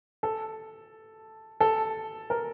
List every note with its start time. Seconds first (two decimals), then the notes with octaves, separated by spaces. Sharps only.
0.23 A4
1.60 A4
2.30 A#4